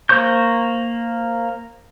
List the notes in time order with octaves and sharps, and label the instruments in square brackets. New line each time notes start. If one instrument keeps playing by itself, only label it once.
[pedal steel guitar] A#3 C5 C#6 G6